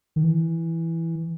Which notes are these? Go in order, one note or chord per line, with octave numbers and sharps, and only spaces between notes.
D#3
E3